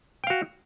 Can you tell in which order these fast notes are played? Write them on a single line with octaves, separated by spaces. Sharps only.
G5 F5 F#4